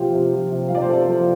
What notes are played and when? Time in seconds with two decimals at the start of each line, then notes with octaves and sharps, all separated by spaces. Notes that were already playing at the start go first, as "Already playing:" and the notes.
Already playing: C3 F3 F4 G4
0.13 C3
0.33 F3
0.51 C3
0.68 F3 F5
0.75 D5
0.82 C5
0.89 C3 A4
1.08 F3